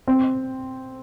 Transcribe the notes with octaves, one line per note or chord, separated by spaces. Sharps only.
C4